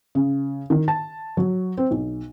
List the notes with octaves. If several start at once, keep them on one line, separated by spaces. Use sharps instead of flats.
C#3
D#3
A5
F#3
C4
B1